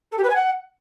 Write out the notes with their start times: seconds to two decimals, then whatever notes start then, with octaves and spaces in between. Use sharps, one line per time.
0.11 A4
0.17 G4
0.23 B4
0.29 G#5
0.35 F#5